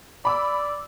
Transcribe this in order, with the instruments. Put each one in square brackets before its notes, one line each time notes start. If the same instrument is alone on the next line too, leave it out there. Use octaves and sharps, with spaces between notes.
[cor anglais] D5 [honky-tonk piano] B5 D6 E6